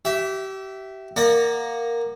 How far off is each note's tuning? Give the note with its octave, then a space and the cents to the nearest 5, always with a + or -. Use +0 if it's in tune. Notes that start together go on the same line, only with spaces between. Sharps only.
G4 -30 E5 +0
A#3 +0 D5 +40 F#5 +0